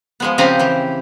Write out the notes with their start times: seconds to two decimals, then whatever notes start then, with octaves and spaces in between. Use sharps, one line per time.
0.20 F3 G#3 B3
0.38 C#3 F3 C4 G4 G#5 A#5
0.59 E3 G4